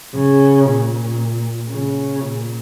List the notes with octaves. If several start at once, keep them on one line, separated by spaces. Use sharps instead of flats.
C#3
A#2
C#3
A#2